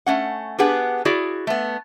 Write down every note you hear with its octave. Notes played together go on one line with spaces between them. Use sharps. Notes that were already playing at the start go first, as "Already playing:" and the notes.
A3 C#4 F#5
B3 D4 G4 G#4 B4 F#5
E4 F#4 G#4 D5
A3 B3